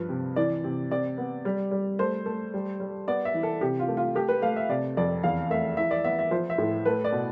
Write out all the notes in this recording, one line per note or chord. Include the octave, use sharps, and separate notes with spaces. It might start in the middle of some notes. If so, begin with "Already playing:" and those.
Already playing: G2 F3 B4
C3
E3 D5
C3
C3 D5
B3
G3
G3
A3 C5
A3
G3
G3
B3 D5
E5
E3
A4
C3 G4
F4
A3
F4
A3 G4
B4
A3 F5
E5
C3 D5
F2 D5
E2 F5
A3 E5
E3 E5
D5
B3 E5
E5
F3 C5
E5
A2
A3 B4
D5
B2